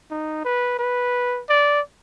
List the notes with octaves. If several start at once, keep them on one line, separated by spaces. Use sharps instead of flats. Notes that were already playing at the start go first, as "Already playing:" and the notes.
D#4
B4
B4
D5